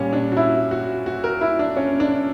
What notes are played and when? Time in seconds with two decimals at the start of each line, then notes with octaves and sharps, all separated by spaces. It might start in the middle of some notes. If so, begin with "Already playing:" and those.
Already playing: A#2 G3 C#4
0.13 D4
0.32 F#4
0.37 E4
0.71 F#4
1.06 F#4
1.24 A#4
1.41 E4
1.59 D4
1.77 C#4
2.00 D4